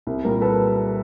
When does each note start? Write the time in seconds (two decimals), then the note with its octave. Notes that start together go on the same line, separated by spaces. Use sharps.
0.07 C2
0.25 A#2 G3 A#4
0.41 A4 B4